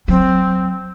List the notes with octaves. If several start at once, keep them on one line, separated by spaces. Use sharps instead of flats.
F#3 C4